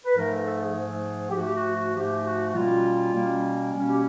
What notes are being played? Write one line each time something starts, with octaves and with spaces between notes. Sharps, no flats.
B4
G#2 F3 A3 A#4
A4
A4
G#4
G#2 F3 A3
G4
G#2 F3 A3 F#4
G4
F#4
F#4
G#2 F3 A3 G4
F#4
F#4
B2 G3 A#3 C#4 F4
B2 G3 A#3 C#4
B2 G3 A#3 C#4
G4